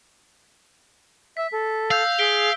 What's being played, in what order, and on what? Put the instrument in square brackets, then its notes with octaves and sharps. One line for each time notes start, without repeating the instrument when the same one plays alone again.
[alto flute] E5 [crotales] B6
[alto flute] A4
[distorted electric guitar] F5 [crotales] E6 G6
[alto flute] G#4 [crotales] B6 D7 G7